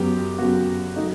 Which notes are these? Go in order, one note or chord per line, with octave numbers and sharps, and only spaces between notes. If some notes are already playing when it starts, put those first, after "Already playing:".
Already playing: F#2 F#3 B3 G4
F#2 F#3 B3 F#4
F#3 A3 D#4